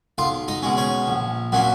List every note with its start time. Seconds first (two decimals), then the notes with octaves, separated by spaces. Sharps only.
0.18 B1 F4 F5
0.48 D#4 D#5
0.62 B2 G#3 C#4
0.77 C#4 C#5
1.08 A#1
1.52 A#2 F#3 A#3 C#4